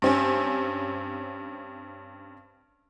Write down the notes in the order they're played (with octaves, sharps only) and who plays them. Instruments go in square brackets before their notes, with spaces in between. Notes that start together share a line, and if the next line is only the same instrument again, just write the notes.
[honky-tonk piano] G2 C4 C#4